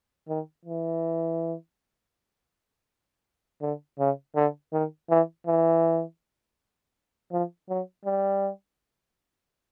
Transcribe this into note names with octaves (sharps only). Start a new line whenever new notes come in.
D#3
E3
D3
C#3
D3
D#3
E3
E3
F3
F#3
G3